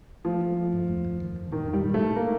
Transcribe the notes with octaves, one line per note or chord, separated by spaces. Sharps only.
F3 A3
A3
A3
G2
F2
F2
D#3
F2
A#2 D#3
D#4
G3
A#2
A3
D#4
A3 A#3